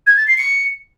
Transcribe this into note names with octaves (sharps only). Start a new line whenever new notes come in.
G#6
A6
C7
C#7